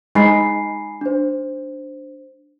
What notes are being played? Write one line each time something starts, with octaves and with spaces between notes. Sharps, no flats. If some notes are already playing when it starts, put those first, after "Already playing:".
G#3 D#4 G#5 B5 C7
D4 C5